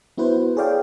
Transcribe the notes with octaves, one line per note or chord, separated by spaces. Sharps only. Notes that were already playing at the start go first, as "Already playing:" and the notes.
B3 E4 F#4 B4 C5
G#4 A4 C#5 D5 F5 G5